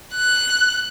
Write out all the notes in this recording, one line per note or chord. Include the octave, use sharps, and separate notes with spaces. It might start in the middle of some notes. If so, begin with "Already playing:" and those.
F#6